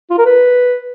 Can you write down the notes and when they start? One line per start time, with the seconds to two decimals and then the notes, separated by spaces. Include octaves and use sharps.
0.10 F4
0.18 A#4
0.26 B4